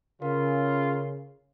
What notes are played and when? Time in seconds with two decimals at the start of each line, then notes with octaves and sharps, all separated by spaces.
0.22 C#3 F4 A#4